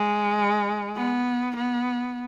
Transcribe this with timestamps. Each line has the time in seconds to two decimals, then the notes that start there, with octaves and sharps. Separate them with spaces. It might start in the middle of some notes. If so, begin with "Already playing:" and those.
Already playing: G#3
0.96 B3
1.56 B3